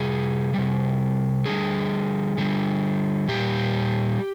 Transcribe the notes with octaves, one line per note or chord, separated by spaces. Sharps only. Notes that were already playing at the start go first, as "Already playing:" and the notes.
Already playing: C3 G3 G#4
C3 G3
D3 G3 G#4
D3 G3
A#2 G3 G4